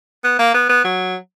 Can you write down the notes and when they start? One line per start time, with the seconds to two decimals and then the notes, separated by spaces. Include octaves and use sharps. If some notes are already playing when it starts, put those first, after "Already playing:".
0.24 B3
0.39 A#3
0.54 B3
0.69 B3
0.84 F#3